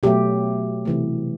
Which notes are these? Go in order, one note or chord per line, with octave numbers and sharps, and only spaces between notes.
B2 F#3 A3 G4
C3 E3 A3